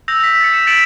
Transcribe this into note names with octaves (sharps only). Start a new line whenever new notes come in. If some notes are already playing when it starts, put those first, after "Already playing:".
E6 G6 A#6 F7
B6
A6 C#7
E7
A6 B6 C#7 D7 E7 F#7